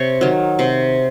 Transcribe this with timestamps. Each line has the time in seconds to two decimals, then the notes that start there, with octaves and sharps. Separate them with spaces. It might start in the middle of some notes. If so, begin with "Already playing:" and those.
Already playing: C3 C#5
0.21 D#3 F#3
0.59 C3